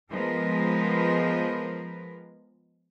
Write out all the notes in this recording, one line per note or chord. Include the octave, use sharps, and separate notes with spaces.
F3 G#3 B3 A#4 B4